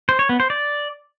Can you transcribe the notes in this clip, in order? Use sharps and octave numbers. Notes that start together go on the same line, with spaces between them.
C5
C#5
B3
C5
D5